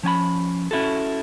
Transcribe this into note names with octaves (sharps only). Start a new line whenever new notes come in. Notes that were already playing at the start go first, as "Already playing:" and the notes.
F3 C#4 G#5 B5
C#4 E4 F#4 A4